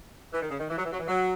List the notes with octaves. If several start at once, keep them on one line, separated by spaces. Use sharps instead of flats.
E3
D#3
C#3
D#3
E3
F#3
E3
F#3
E3
F#3